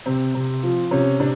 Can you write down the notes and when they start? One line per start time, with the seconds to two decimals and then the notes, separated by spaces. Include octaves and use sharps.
0.06 C3 C4
0.35 C3
0.63 F3
0.91 C3 C#4
1.20 C3 D4